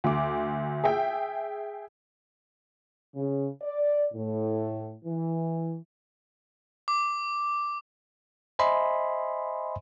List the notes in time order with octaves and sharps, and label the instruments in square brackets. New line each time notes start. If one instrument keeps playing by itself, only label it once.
[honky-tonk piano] D2 D6
G#4 E5 G5
[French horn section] C#3
D5
A2
E3
[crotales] D6
[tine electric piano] C5 D#5 E5 G#5 B5 C6